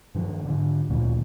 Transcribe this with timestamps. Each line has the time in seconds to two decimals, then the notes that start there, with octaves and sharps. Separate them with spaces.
0.15 G2 D#3 F3
0.46 G#2 D3
0.89 D2 A#2 D#3 F3